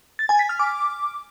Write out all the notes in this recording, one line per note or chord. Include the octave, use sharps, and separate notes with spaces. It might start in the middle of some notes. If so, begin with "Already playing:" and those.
A6
G#5
B6
F6
D6